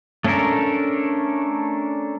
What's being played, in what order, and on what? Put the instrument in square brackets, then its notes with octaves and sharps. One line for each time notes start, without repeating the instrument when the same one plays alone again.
[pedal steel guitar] A3 C#4 D4 A4 A#4